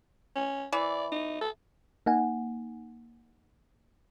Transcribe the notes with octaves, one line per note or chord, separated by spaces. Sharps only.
C#4
E3 D5
D#4
A4
A#3 D#4 F#5 G#5